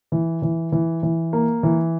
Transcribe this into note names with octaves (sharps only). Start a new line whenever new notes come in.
E3
E3
E3
E3
A#3
E3